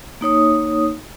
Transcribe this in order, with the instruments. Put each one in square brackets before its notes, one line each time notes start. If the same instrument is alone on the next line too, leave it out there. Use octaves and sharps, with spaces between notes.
[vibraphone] A#3 D#4 C#5 D#6